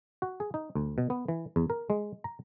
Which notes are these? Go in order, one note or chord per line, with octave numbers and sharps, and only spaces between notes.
F#4
G#4
D#4
D2
B2
B3
E3
E2
A#4
G#3
A#5